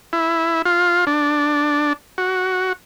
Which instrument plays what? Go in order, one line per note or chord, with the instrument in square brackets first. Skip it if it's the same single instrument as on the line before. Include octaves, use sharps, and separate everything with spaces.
[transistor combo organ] E4
F4
D4
F#4